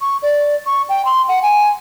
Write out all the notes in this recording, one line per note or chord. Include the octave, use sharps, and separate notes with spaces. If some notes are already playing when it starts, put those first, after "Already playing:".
C#6
D5
C#6
G5
C6
F#5
G#5